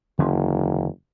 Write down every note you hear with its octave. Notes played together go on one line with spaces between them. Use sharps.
F#1 E2 D3 C#4